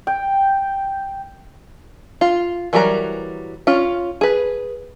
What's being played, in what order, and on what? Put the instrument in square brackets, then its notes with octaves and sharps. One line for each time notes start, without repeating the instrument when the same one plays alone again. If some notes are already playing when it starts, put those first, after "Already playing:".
[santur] G5
[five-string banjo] F4
E3 F#3 G3 A#4 A#5
C#4 F4
G#4 B4